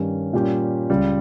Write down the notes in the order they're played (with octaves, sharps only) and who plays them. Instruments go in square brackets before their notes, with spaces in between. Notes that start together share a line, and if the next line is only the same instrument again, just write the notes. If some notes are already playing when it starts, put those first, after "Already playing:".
Already playing: [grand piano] G2 D#3 G3 C#4 G4
A#2 G3 C#4 G4
C#2 C#3 G3